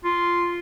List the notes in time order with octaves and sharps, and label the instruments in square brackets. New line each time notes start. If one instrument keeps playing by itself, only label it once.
[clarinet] F4